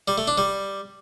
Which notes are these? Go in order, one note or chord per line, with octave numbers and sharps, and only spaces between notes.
G3
A3
D4
G3